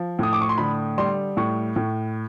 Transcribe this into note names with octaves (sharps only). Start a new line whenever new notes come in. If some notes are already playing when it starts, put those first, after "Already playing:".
Already playing: F3
A2 D#6
D6
C#6
C6
D3 B5
G3 C6
A2 C#6
A2